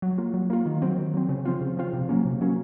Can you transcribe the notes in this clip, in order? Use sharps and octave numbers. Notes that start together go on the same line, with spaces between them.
F#3
A#3 F4
F#3
A#3 F4
D#3
F#3 C4
D#3
F#3 C4
C#3
F3 C4 F4
C#3
F3 C4 F4
C3
F#3 A#3 C#4
C3
F#3 A#3 C#4